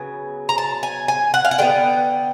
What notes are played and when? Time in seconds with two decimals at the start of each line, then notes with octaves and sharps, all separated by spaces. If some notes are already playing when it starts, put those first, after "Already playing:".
Already playing: C#3 F#3 B3 G#5
0.49 A#5
0.58 A5
0.83 G#5
1.08 G#5
1.34 F#5
1.45 F5
1.51 F#5
1.58 D3 G3 B3 G5